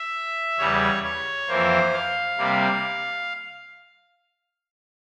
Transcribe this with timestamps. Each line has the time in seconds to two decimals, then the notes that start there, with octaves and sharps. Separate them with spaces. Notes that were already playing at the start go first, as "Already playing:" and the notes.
Already playing: E5
0.58 E2 C#3 G3 C#5
1.03 C#5
1.48 F2 E3 A#3 C5
1.93 F5
2.37 C3 G3 A#3